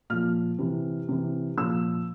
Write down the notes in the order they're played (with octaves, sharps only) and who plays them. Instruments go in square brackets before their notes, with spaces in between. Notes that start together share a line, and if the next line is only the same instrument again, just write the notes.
[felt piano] A#2 F3 F6
C3 E3
C3 E3
A#2 F3 E6